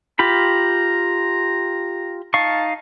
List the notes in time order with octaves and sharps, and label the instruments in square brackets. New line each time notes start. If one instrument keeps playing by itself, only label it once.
[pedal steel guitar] F4 G4 B5 [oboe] A#5
[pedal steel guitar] D#4 F5 C#6 [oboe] A5